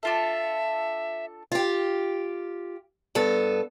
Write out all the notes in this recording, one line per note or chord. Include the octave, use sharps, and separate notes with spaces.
D4 F4 A4 E5
F4 G4
G2 B3 A4